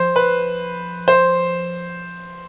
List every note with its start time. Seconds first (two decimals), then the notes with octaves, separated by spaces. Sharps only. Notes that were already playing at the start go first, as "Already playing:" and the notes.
Already playing: F3 C5
0.16 B4
1.08 C5